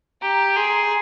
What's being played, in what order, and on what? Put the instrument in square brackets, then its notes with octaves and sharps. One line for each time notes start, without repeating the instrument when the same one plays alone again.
[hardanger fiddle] G4 [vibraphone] A#5
[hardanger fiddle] G#4 [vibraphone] C6
[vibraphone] A#5
G#5